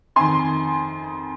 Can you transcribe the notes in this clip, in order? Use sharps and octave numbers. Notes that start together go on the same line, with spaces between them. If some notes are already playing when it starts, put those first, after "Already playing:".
F2 D#3 G#5 C6